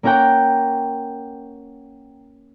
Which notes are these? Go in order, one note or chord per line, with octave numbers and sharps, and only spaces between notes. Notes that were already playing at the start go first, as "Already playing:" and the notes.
A#3 C#4 A#4 F#5 G5 A#5